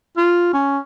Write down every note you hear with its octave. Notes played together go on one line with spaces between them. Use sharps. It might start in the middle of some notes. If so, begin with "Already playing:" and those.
F4
C#4